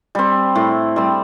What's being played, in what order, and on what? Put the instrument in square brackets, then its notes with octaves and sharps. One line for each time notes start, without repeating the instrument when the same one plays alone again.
[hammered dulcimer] G3 C4
A2
G3 C4